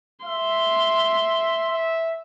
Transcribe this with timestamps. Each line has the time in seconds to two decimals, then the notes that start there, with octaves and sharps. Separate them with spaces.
0.25 E5 C6
1.70 E5